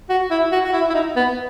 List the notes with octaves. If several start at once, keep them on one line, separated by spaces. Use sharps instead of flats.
F#4
E4
F#4
F#4
E4
E4
D#4
B3